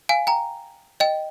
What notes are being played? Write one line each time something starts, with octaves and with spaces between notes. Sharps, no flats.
F5 G#5
G5 A#5
D#5 G5